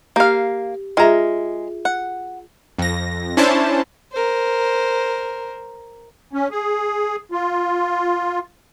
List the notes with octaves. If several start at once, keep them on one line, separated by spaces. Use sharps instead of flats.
A#3 G4 F5
G#3 F4 G#4 E5 A#5
F#5
F2 A#6
C#4 D4 E4 C5 A5
A#4 C5
C#4
G#4
F4